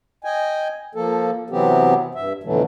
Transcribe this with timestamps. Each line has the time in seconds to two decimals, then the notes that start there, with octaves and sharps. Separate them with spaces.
0.24 D#5 G5 G#5
0.95 F3 A#3 A4
1.50 C3 E3 F#3 B3 C4 G4
2.15 G2 E5
2.43 F2 B2 D3 E3 F#3 A3